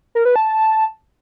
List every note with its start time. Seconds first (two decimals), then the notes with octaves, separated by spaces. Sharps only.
0.15 A#4
0.25 B4
0.36 A5